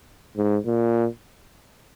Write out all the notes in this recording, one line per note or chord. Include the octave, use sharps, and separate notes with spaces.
G#2
A#2